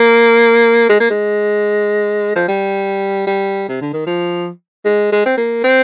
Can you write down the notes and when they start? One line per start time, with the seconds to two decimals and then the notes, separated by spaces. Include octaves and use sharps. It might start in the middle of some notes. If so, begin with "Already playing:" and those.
Already playing: A#3
0.89 G#3
1.00 A#3
1.10 G#3
2.35 F3
2.48 G3
3.27 G3
3.69 C3
3.81 D3
3.93 D#3
4.06 F3
4.85 G#3
5.12 G#3
5.26 C4
5.37 A#3
5.64 C4